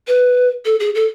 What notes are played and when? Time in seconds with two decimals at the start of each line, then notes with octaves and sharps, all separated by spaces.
0.08 B4
0.65 A4
0.80 G#4
0.95 A4